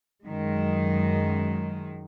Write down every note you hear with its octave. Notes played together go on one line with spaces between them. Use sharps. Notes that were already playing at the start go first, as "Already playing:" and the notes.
F#2 D#3 G#3